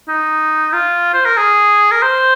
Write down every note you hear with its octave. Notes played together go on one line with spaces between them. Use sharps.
D#4
F4
C5
A#4
G#4
A#4
C5